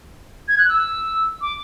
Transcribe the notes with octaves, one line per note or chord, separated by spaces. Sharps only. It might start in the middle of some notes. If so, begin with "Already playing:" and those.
G#6
F#6
E6
D6